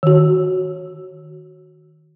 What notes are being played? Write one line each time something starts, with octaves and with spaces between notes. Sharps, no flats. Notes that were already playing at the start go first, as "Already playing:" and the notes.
D#3 F#4